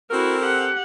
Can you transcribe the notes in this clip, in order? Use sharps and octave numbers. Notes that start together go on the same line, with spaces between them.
C4 E4 F#4 A4 A#4
G4 F#5